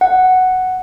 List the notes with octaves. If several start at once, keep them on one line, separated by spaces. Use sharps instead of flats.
F#5